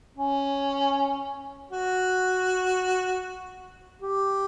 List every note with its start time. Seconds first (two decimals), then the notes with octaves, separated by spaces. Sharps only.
0.17 C#4
1.71 F#4
4.02 G4